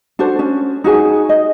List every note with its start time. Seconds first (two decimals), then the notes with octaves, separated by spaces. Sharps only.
0.19 D4 F#4 A4 C5
0.39 C#4 D4
0.84 D#4 F#4 G#4 G#5
1.29 D#5